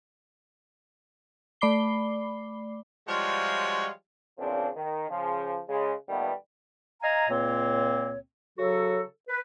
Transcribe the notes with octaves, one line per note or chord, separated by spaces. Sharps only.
A3 D5 B5 D6 C7 G7
F3 G3 G#3 F4 F#4 C#5
E2 A#2 C#3 F3 C4 D4
D#3
C#3 F3
C#3 G#3
A#2 D#3 G3 A3 B3
D#5 F5 G#5 A#5
C#2 A#2 A#3 C4 C#5
C#3 F#3 F#4 A4
B4